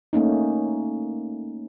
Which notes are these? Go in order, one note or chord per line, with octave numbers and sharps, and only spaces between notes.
A3 A#3 C#4 D#4